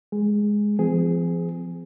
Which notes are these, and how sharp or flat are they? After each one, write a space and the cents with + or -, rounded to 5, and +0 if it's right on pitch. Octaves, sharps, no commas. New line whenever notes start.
G#3 +0 G#4 +0
F3 -35 C4 -40 G#4 +0